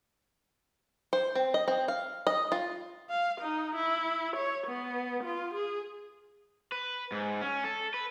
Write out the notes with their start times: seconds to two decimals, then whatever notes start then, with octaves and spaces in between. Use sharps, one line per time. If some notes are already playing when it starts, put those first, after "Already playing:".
1.13 C5
1.35 C4
1.54 D#5
1.68 C4
1.88 F5
2.27 D#5
2.52 F4
3.10 F5
3.41 D#4
3.75 E4
4.36 C#5
4.67 B3
5.23 F4
5.54 G#4
6.72 B4
7.12 G#2
7.42 C#4
7.64 A4
7.94 B4